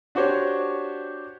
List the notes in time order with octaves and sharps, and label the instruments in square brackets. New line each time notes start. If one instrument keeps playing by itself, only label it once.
[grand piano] D4 F#4 G4 C5 C#5